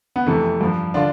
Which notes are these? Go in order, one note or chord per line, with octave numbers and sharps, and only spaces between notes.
B3
F2 C3 E3 A3
G2 F3
D3 D4 F4